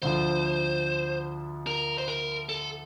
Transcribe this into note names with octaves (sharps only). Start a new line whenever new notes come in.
D2 D3 F3 C5
A#4
C5
A#4
A4